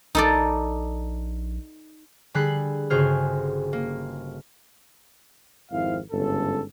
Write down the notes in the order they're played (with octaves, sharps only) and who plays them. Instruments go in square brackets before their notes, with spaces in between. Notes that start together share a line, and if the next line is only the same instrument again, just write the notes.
[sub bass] A#1 [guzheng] D#4 A4 D5
[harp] D3 G3 G#4 B5 F#6 C7
G1 C#3 F#4 G#4 C5 F6
A#3
[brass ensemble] G#1 F2 C4 E4 F5
G1 G#2 C#3 C#4 A4